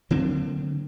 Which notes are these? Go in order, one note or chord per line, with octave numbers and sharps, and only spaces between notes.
D3 F#3 A#3 C4